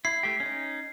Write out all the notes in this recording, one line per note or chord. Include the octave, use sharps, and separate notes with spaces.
E4 C7
A3 G4
C#4 D#4